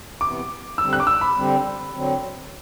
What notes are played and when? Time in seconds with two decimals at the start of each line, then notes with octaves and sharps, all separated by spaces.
0.21 C3 E3 B3 D6
0.78 D3 G3 C4 E6
0.93 F#6
1.00 D6
1.07 E6
1.21 B5
1.35 D3 G3 C4
1.94 D3 F#3 C4